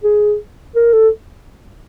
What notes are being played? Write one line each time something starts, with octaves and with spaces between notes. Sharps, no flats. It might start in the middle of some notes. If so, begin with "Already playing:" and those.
G#4
A#4
A4